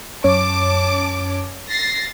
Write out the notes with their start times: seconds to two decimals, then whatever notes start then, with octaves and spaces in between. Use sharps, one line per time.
0.24 F#2 C#4 C#5 A5 D6
1.69 A6 A#6 C7